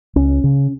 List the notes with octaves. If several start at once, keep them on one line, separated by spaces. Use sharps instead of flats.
C#2 C#4
C#3